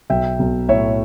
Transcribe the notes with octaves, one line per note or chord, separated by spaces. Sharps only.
B1 E5 G5
B1
A2 C#5 E5